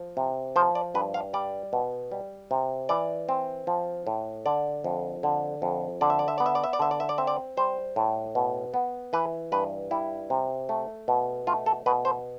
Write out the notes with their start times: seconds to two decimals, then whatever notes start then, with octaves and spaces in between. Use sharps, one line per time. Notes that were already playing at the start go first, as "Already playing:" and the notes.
Already playing: F3
0.17 C3
0.56 F3 C5
0.75 D5
0.94 G2 B4
1.14 F5
1.33 G3 D5
1.73 B2
2.12 G3
2.51 C3
2.89 E3 D5
3.29 C4
3.67 F3
4.07 A2
4.46 D3 D5
4.84 F2
5.23 D3
5.62 F2
6.01 D3 D5
6.10 E5
6.19 D5
6.28 E5
6.38 B3 D5
6.46 E5
6.55 D5
6.64 E5
6.73 D5
6.79 D3 E5
6.91 D5
7.00 E5
7.09 D5
7.18 C4 E5
7.27 D5
7.57 G3 C5
7.96 A2
8.35 B2
8.74 B3
9.13 E3 B4
9.52 G2 B4
9.91 G3 E4
10.30 C3
10.69 A3
11.08 B2
11.47 A3 F4
11.66 A4
11.86 B2 B4
12.05 C5